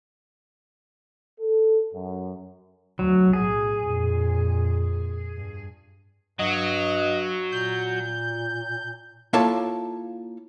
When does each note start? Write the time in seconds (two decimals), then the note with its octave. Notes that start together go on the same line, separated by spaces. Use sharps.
1.41 A4
1.94 F#2
2.99 D2 F#3
3.33 B1 A2 G#4
3.81 F2 A#2
5.37 G2
6.39 G2 F#3 D#5
7.52 A#2 G6
9.33 A#3 E4 F4 A4 C#5 A5